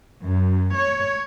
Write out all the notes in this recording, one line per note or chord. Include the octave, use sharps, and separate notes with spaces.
F#2
C#5